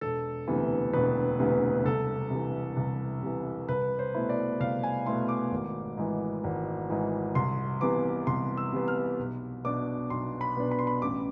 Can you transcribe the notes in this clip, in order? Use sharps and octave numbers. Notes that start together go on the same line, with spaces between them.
E1 A4
D2 C3 E3 B3
E1 B4
D2 C3 E3 B3
C2 A4
C3 E3
C2
C3 E3
C2 B4
C5
B2 A3 E4
D5
C2 F5
G#5
B2 A3 E4 C6
D6
G#1
G#2 E3
G#1
G#2 E3
C2 C6
C3 E3 B3 D6
C2 C6
E6
C3 E3 B3
F6
B1
B2 B3 D4 D6
B1 C6
B5
B2 B3 D4
B5
C6
B5
A1 D6